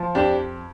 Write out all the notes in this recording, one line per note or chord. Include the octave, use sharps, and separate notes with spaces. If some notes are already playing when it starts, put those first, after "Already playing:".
Already playing: F3
F2 D4 G4